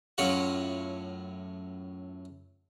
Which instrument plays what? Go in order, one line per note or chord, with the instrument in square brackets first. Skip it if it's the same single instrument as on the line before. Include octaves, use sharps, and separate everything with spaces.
[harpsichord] F#2 A2 F#3 F4 F#5